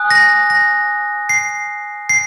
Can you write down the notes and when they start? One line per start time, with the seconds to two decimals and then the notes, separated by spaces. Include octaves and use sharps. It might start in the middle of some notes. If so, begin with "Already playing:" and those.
Already playing: G#5 D#6 F#6
0.11 A#6
0.50 A#6
1.29 C7
2.09 C7